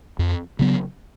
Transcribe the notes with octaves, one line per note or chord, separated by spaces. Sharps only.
F2
C#3 F#3 B3